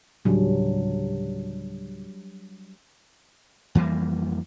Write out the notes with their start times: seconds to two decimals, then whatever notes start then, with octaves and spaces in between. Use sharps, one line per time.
0.25 D2 A2 C#3 F#3 G3 D4
3.75 F2 E3 G3 A#3